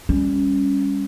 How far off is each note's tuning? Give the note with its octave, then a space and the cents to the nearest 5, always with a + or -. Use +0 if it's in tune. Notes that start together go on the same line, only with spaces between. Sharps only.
G3 +25 C#4 +0